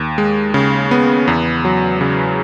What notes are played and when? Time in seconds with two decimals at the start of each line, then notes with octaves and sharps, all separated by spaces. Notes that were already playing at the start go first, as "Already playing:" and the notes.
Already playing: D#2
0.18 G#3
0.54 C#3
0.91 B3
1.28 E2
1.65 F#3
2.01 C#3